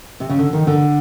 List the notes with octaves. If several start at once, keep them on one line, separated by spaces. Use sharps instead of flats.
C3
C#3
D3
D#3
D3